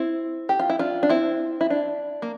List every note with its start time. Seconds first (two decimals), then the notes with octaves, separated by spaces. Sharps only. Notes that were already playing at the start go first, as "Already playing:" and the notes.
Already playing: C4 E4
0.49 G4
0.59 F4
0.70 E4
0.79 D4 F4
1.03 D4
1.09 C4 E4
1.61 E4
1.70 D4
2.22 A#3